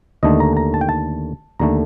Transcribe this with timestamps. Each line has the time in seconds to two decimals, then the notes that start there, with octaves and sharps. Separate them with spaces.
0.23 D#2 D3 A3 D#5
0.40 A#5
0.57 A#5
0.74 A5
0.81 G5
0.89 A5
1.60 D#2 D3 A3 A#5